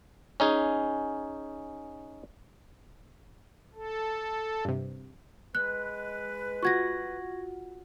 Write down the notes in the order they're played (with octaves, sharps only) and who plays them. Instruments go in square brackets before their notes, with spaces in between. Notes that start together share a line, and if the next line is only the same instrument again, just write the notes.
[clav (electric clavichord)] C#4 D#4 G#4
[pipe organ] A4
[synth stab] G2 C3
[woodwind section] G#3 B4 [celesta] F#6
[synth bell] F4 F#4 F#5 [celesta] C#6 G#6 A#6